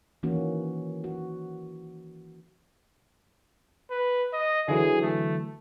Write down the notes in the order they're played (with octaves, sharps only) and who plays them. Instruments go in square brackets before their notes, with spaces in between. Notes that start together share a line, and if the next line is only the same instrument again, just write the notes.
[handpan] D#3 E3 A#3 C#4 F#4
F#4
[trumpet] B4
D#5
[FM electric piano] D3 E3 F#3 [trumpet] G#4
[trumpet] A3